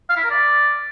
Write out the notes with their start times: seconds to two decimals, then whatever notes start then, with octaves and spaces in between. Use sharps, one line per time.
0.10 F5
0.17 E4
0.24 A#4
0.31 D5